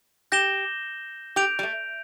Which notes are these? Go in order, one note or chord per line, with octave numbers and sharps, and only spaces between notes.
G4 G6 A#6 E7 G7
G4 G6 D7 F7
G3
A3